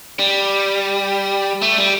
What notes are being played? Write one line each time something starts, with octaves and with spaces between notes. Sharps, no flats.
G3
A3
G3